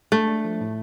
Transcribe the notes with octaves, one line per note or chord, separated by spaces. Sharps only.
A3 D4
D4
F3
A2